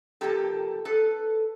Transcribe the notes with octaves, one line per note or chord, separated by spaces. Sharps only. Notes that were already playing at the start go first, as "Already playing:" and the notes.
C3 F3 A#3 G4 A4
A4 B4